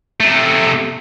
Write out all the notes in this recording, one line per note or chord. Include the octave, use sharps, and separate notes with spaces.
C3 A3